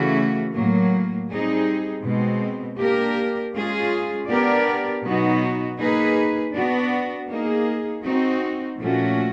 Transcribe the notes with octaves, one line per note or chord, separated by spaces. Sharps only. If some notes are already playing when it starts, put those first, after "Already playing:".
Already playing: C#3 E3 A3 C#4 F#4
A2 F#3 A#3
G3 C4 D#4 G#4
B2 G#3 C4
A#3 D4 G4 A#4
G#3 C#4 F4 G#4
B3 D4 G4 A#4 D5
B2 F#3 B3 D#4 F#4
A#3 D#4 G#4 B4
B3 D4 F#4
A#3 D#4 G#4
C4 D#4 F#4
A#2 F3 A3 C#4 F#4